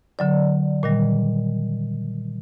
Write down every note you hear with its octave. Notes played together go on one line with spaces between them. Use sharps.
D3 F#3 D5
A#2 D#3 G3